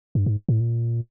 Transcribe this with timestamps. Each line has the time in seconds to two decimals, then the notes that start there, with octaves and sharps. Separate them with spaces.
0.15 G2
0.26 G#2
0.49 A2
0.60 A#2